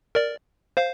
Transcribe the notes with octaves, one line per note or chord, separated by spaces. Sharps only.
A#4 D5
C5 F5